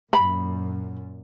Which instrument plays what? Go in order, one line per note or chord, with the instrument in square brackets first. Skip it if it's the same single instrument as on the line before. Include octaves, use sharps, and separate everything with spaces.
[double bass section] F#2 A#2 [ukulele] B5